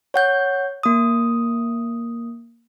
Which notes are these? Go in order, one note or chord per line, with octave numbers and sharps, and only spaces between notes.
C#5 F#5 G6
A#3 D#6